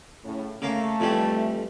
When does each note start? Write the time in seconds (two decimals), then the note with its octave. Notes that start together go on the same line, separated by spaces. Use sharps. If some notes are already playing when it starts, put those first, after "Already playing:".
0.24 A2 C#3
0.62 C#3 A3 A#3
1.00 F2 E3 G3